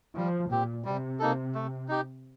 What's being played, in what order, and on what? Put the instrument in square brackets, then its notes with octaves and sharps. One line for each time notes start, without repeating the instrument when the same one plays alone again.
[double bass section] F3 [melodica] G3
[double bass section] A#2 [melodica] C4 G4
[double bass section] C3 [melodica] G3
[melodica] A#3 D#4 A4
A3
D#4 G4